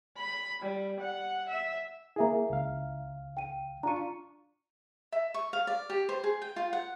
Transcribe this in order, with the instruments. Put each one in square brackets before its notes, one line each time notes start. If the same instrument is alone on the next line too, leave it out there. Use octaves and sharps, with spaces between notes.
[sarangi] B5
G3
F#5
E5
[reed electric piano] A#3 G#4 [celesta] E4 E5 A#5
[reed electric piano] C#2 F5
[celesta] G5 D#7
[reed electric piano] D4 F4 C#6 [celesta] A#5 D#7
[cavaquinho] E5
C#6
F5
D5
G4
C5
G#4
G5
F4
F#5